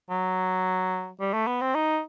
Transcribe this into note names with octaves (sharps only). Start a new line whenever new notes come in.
F#3
G3
A3
B3
C4
D#4